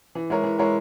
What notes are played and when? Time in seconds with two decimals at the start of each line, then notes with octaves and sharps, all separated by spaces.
0.15 E3
0.30 G#3 E4 A#4 C#5
0.44 E3
0.59 G#3 E4 A#4 C#5